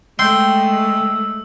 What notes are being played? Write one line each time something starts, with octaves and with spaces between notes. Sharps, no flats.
G#3 A3 G5 C6 E6